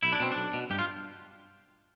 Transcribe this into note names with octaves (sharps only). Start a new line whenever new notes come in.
B1 E4
D4
B2 C4
B1 D4
B2
G2 G4
F4